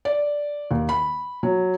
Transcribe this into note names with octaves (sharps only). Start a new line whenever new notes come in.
D5
D#2
B5
F#3